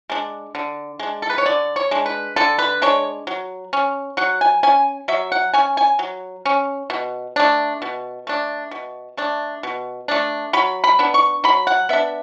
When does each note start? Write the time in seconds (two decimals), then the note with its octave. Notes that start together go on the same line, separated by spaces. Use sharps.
0.10 G#3 D4
0.55 D3
0.99 G#3 D4
1.22 A4
1.30 B4
1.38 C#5
1.46 D3 D5
1.76 C#5
1.91 G#3 D4
2.06 B4
2.36 D3 A4
2.59 B4
2.82 G#3 D4 C#5
3.27 F#3
3.73 C#4
4.17 F#3 F#5
4.41 G#5
4.63 C#4 G#5
5.08 F#3 E5
5.32 F#5
5.53 C#4 G#5
5.77 G#5
5.99 F#3
6.45 C#4
6.90 B2
7.36 A3 D4
7.82 B2
8.27 A3 D4
8.71 B2
9.17 A3 D4
9.63 B2
10.08 A3 D4
10.53 F#3 B5
10.84 B5
10.99 B3 D4
11.14 C#6
11.44 F#3 B5
11.67 F#5
11.89 B3 D4 E5